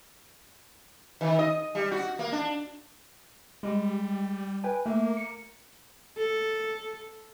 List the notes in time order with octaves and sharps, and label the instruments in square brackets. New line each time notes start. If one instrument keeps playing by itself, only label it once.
[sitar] D#3
D#5
G3
F#4
A#3
D4
[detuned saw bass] G3 [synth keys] G#3
[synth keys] B4 G5 G#5
[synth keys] A3 [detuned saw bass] A#3
[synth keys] C#7
[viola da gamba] A4